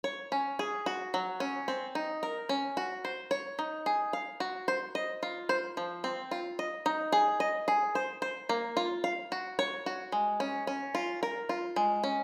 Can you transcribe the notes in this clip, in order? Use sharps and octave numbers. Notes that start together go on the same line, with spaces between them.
C#5
C#4
G#4
F#4
F#3
C#4
C4
D#4
A#4
C#4
F#4
C5
C#5
D#4
G#4
F5
F#4
C5
D#5
F4
C5
F3
C4
F4
D#5
D#4
G#4
D#5
G#4
C5
C5
A#3
F4
F5
F#4
C#5
F#4
G#3
C#4
C#4
F4
A#4
F4
G#3
C#4